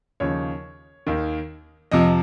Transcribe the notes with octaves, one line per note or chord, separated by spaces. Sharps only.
D#2 C#3 F3 C#5
D#2 D#3
F2 C3 F3 D#5